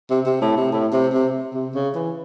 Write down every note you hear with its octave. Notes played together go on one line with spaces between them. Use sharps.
C3
C3
A2
C3
A2
C3
C3
C3
C#3
E3